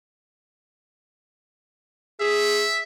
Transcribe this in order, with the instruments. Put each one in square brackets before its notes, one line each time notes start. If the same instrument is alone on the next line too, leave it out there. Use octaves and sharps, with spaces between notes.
[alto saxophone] G#4 [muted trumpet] E5